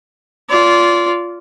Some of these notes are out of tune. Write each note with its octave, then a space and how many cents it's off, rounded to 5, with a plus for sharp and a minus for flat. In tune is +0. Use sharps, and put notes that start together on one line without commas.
F4 -5 D5 -30